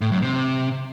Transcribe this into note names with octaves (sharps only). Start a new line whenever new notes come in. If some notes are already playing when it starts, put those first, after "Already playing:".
A2
F#2
C3